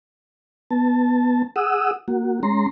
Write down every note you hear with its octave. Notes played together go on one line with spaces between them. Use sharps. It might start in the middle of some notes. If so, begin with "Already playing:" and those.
B3 A5
G#4 F#5 D#6 E6
A#3 F#4
G#3 C#4 A#5 C6